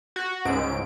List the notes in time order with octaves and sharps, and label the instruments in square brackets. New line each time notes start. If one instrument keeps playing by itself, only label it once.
[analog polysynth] F#4
C#2 G#2 D7